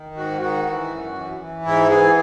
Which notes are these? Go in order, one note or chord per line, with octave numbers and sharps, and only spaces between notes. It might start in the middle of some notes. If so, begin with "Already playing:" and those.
Already playing: D#3
G#2 F#4
D#3 F#4
E3
F#2
E3
E3
G#2 E4
E3 G#4